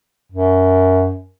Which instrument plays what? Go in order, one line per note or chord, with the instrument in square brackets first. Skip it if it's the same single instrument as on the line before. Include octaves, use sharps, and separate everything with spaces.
[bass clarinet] F#2